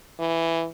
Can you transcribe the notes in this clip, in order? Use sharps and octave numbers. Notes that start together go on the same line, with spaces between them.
E3